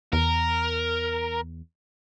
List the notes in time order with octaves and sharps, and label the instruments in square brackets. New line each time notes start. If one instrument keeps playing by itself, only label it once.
[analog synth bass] E2 [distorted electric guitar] A#4